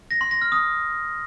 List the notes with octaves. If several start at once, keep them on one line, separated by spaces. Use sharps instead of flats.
A#6
C6
A#6
F6
D#6